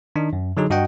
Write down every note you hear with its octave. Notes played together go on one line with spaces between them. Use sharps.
D#3 D4 D#4
F#2
D3 F#3 D#4 G#4
G2 F#4 D#5 F#5 G5